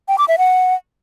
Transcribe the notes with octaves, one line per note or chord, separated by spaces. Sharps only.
G5
D6
E5
F#5